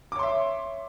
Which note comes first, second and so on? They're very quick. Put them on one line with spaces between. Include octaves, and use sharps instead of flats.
D6 C#5 C6 E5